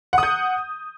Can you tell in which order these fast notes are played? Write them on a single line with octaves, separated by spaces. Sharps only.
F#5 D#6 G6